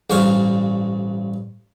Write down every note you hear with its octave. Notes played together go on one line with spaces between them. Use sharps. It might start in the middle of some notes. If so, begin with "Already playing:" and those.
A1 G2 C5 C#5 F5